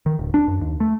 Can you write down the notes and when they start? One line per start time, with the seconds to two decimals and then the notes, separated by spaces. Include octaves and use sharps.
0.06 D#3
0.19 D1
0.34 D4
0.48 F#2
0.61 D#2
0.80 A3